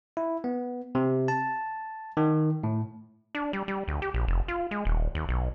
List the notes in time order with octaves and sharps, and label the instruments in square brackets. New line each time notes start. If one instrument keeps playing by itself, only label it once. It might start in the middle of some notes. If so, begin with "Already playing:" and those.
[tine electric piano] E4
B3
C3
A5
D#3
A2
[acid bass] D4
G3
G3
D2
G4
A#1
F1
F4
G#3
D#1
D#2
B1